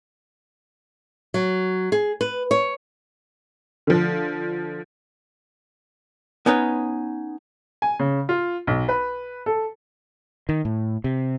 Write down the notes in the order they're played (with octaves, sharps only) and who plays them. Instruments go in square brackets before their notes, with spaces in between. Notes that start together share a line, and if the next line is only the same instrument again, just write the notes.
[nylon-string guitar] F#3
G#4
B4
C#5
[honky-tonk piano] D3 F3
[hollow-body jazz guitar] B3 C#4 D#4 B4 C#5
[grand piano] G#5
C#3
F4
B1
B4
A4
[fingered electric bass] D#3
A2
C3